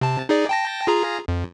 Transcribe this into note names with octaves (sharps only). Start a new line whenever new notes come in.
C3 A5
D#4 G#4 D5
G5 A5 A#6
F4 G#4 A#5
F2